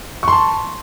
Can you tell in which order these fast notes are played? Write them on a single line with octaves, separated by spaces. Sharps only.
C#6 C6 A5